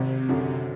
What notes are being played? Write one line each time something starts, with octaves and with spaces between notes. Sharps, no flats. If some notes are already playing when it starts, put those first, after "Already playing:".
Already playing: G#1 C3
F#2 D3 F#3